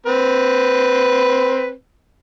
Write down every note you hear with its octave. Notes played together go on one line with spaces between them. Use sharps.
C4 B4